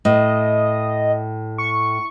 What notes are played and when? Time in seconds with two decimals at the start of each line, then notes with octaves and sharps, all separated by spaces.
0.05 A2 D#5
1.58 C#6